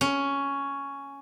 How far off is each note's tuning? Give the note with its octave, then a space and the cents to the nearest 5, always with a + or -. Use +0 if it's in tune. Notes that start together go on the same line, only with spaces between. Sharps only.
C#4 +5